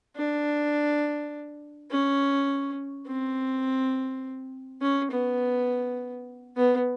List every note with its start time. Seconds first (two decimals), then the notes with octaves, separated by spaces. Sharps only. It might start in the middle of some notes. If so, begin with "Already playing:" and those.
0.16 D4
1.91 C#4
3.07 C4
4.82 C#4
5.11 B3
6.56 B3